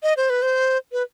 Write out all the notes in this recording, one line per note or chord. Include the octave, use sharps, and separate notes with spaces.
D#5
C5
B4
C5
B4